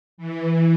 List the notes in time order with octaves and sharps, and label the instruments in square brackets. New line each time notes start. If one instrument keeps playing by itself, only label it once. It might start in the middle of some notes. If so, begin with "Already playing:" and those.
[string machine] E3